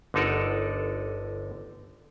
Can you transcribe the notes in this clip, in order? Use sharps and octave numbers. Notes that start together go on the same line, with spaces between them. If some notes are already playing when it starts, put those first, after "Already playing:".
G1 D3 D#4 A4 A#4 F#5